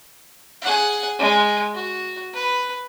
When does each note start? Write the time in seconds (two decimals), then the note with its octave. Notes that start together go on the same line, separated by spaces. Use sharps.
0.62 G#4 F#5
1.19 G#3
1.74 F#4
2.34 B4